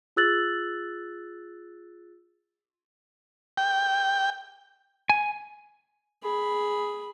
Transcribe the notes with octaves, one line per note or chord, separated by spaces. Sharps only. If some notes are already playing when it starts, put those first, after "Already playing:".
F4 G#4 E6 F#6 A6 F#7
G5
G#5
G#4 B5